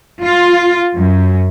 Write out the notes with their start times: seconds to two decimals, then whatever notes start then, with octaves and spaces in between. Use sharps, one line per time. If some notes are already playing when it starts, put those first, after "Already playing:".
0.23 F4
0.96 F#2